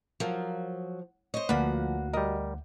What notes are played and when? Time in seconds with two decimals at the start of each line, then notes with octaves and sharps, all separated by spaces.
0.20 F3 F#3 F4 A#4
1.34 C5 C#5 D#5
1.49 D2 F3 A#3 F#4 B4 D5 F#5
2.14 G3 A#4 D#5